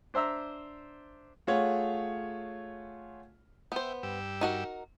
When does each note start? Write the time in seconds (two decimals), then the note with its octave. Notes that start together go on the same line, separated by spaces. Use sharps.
0.14 D4 C5 E5 A#5 E6
1.47 A3 F4 G#4 C#5 F#5
3.72 B3 C5 E5 G5
4.03 G2 G4 E6
4.41 D#4 F#4 A#4